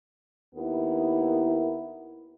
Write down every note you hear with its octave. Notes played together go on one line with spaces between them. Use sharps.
D#2 B3 E4 A#4